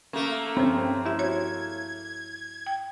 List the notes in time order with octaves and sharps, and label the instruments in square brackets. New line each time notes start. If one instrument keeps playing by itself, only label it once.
[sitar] A3 A#3 [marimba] C#4
[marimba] G2 F3 [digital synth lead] C4 [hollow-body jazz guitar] C#4 C5
[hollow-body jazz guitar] E4 [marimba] G4 E5
[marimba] F#4 C#5 [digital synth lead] G#6
[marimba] G5